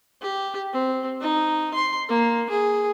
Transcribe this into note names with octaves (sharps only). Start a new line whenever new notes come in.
G4
C4
D#4
C6
A#3
G#4